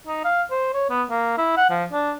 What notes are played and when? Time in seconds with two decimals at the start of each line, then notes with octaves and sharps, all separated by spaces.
0.07 D#4
0.25 F5
0.51 C5
0.74 C#5
0.90 B3
1.10 A#3
1.38 E4
1.57 F#5
1.70 F3
1.92 D4